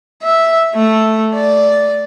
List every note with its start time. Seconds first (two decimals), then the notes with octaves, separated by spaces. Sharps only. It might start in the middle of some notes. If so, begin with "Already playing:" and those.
0.23 E5
0.74 A3
1.35 D5